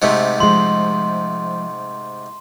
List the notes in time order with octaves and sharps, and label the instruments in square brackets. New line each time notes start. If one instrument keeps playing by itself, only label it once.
[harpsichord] G#2 C3 A3
[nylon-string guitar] F3 G#3 [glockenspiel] C6